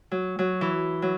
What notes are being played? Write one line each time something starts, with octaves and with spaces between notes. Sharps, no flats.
F#3
F#3
E3
F#3